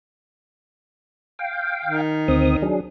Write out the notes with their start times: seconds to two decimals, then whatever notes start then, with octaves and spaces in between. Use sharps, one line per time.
1.39 F5 G5
1.85 D#3
2.28 D2 C4 D#6
2.62 F#3 D4 G#4